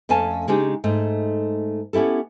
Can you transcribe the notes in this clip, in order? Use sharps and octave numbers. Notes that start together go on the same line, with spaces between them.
F2 A3 C#4 F5 G#5 A5
C#3 G#3 D4 D#4 G4 G#4
G#2 A3 D#4
B3 C#4 E4 G4 A4